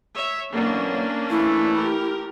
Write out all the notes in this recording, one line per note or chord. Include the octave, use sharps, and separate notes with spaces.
C#5 E5
A1 B2 F#3 A#3 C#4 D4
E3 A3 E4
G4 A#4